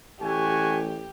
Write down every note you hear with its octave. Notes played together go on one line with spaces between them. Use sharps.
A1 A3 F#4 G4 G#5